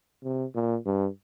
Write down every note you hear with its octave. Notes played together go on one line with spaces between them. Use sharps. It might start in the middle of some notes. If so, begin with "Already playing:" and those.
C3
A#2
G2